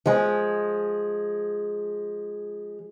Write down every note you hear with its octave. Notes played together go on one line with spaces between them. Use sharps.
F3 G#3